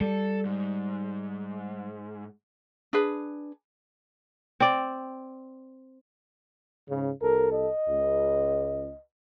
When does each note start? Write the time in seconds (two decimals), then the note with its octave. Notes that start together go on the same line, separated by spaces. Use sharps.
0.01 G3 A4
0.45 G#2
2.93 D4 G#4 B4
4.60 C4 D5
6.89 G#2 C#3
7.22 C2 A4 A#4
7.52 D#5
7.89 C#2